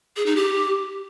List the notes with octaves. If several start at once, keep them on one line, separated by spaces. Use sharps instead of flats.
G#4
D#4
G4